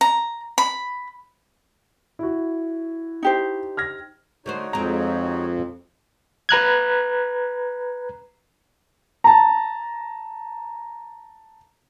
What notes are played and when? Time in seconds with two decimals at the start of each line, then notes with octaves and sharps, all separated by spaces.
0.01 A#5
0.58 B5
2.19 E4 F#4
3.23 D#4 G4 C5
3.77 F6 G#6 A#6
4.46 D3 A3 D#4 F#4 C5 C#5
4.73 F2 G#3 C4 A#5
6.49 B4 A#5 F#6 G#6
9.24 A5 A#5